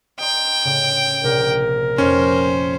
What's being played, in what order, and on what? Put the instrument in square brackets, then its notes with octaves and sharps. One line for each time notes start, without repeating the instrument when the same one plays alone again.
[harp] D#5 A#5 C6 [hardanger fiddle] G5
[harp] A2 C#3
[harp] A#1 C3 [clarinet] A#4
[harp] F2 D#4 G4 [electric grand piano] C#4 [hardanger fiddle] C5